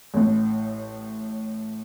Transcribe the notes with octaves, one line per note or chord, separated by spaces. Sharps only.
A1 A2